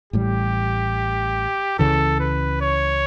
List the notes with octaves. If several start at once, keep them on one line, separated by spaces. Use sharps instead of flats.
A1 A2 G3 G4
C#2 C#3 E3 A4
B4
C#5